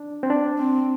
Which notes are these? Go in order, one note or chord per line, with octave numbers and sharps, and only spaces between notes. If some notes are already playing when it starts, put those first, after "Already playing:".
Already playing: D4
C4
D4
C4